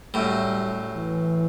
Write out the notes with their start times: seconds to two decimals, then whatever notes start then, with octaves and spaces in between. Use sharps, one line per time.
0.14 F#2 A2 G3
0.96 E3